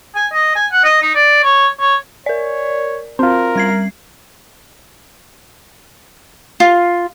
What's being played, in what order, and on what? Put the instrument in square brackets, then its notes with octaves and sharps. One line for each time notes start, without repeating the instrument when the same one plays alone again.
[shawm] G#5
D#5
G#5
F#5
D#5
D#4
D5
C#5
C#5
[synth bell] A#4 D5 [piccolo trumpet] C#5
[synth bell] C4 [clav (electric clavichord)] F4 C5 [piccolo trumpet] A#4
[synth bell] G3 G#6 C7
[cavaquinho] F4